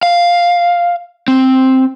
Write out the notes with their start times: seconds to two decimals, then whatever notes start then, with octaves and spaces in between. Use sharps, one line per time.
0.03 F5
1.28 C4